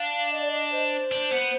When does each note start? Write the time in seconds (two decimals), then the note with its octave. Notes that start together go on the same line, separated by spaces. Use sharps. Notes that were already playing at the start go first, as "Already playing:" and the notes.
Already playing: D4 F5
0.32 D#5
0.42 D5
0.51 D#5
0.72 C5
1.12 D4
1.32 B3